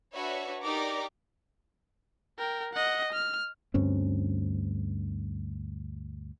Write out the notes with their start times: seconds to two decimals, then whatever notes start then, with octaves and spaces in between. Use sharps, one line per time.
0.13 D4 F#4 B4 C#5 E5
0.62 D#4 G4 A#4 D5 A#5 D6
2.39 A#4 G5
2.74 D#5 F#5
3.13 F6
3.74 D2 G2 C4 C#4